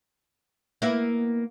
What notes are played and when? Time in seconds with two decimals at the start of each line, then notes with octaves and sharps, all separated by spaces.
0.82 A#3 B3 E4